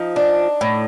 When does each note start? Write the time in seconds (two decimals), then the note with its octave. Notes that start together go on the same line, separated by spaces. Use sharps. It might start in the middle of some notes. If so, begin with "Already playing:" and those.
Already playing: F3 D#4
0.16 D4
0.61 A2